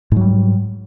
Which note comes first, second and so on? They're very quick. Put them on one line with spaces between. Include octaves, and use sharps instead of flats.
G#2 F#3 G3